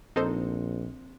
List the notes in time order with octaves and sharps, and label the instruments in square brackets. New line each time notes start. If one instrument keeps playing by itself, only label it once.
[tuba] A#1 [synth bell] C4 [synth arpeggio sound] D#4 A4 C5